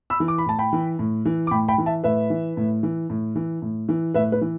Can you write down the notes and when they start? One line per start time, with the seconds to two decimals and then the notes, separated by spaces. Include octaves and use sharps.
0.10 B5 E6
0.20 E3
0.28 D6
0.38 B5
0.46 A2 A5
0.59 G5 B5
0.73 E3
0.99 A2
1.25 E3
1.47 D6
1.51 A2 G5 B5
1.68 G5 B5
1.78 E3
1.86 E5 A5
2.04 A2 B4 E5
2.30 E3
2.57 A2
2.83 E3
3.10 A2
3.35 E3
3.62 A2
3.89 E3
4.14 A2 B4 E5
4.32 B4
4.41 E3